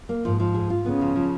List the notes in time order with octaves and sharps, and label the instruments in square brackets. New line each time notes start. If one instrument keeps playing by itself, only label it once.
[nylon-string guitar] A#3
[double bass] G#2 [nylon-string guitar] F3
[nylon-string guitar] F3
G#4
F4
[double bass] C#3 [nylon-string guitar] B3
[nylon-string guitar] F3
F3